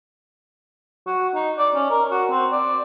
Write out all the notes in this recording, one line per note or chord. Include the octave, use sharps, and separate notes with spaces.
F#4
D#4
D5
C#4
A#4
F#4
C4
D5